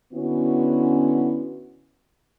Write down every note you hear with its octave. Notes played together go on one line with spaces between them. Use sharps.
D3 B3 C#4 E4 F#4